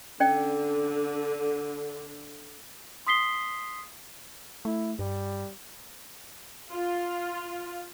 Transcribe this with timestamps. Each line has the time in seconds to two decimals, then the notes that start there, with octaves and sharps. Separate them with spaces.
0.20 D3 C#4 D5 G5
3.07 C6 D#6 B6 C7 G7
4.65 A3 E4
4.99 G2 G3
6.71 F4